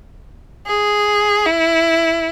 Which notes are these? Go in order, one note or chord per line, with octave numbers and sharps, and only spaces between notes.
G#4
E4